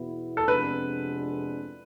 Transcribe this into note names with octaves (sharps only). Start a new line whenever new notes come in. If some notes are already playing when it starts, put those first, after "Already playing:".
Already playing: E2 B2 B3 E4
A4
F2 C3 G#3 B3 D4 B4